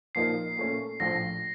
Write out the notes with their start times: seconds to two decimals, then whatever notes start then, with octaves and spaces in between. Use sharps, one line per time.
0.15 A#2 F3 A#3 D#4 C7
0.57 A#2 A3 C#4
1.00 A#1 A2 F3 A#6